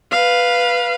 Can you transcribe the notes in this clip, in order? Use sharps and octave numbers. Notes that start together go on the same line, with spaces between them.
B4 F5